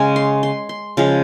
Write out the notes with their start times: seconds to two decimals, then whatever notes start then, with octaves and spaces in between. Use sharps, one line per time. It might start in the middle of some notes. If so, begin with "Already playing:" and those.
Already playing: C#3 G#3 C#4 G#5
0.16 C6
0.43 C6
0.69 C6
0.97 C#3 F3 G#3